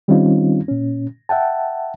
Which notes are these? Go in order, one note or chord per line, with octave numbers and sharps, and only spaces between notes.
D#3 G3 C4 C#4 D#4 F4
A#2 C#4
E5 F#5 G5 A5